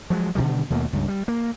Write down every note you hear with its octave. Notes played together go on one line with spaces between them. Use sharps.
F3 F#3 G#3
B2 D3 D#3 G3
D#2 B2 A3 A#3
C#2 G2
G3
A#3